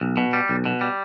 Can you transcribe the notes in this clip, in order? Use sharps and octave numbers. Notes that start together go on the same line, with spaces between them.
B1
B2
G3
B1
B2
G3